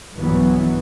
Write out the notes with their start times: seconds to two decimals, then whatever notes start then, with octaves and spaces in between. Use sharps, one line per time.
0.14 B1 G2 E3 F#3 B3